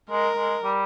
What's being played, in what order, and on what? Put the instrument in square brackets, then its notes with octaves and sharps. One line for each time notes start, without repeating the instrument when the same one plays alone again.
[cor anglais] G#3 [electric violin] A#4
[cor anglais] G#3
G3